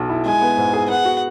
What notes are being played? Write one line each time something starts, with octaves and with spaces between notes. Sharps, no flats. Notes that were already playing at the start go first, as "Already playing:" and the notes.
Already playing: B1 B2 F#3
E4
G#3 G#5
B3
G#2
G#4
B3 F#5
F#4